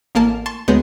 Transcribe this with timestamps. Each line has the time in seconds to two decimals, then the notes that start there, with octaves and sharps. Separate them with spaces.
0.15 A1 A#3 A#4 A5
0.46 A5 C6 C#6 A6
0.68 D2 G#3 B3 C#5 G6